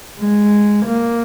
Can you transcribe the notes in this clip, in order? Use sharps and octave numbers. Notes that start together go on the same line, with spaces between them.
G#3
A#3